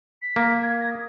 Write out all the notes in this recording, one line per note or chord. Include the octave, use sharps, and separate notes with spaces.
B6
A#3
G#6
A#6
D#6